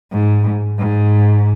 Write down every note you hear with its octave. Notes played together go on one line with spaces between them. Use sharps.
G#2
G#2